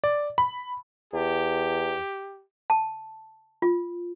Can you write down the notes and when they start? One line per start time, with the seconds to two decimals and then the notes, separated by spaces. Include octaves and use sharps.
0.04 D5
0.38 B5
1.13 E2 G4
2.70 A5
3.62 F4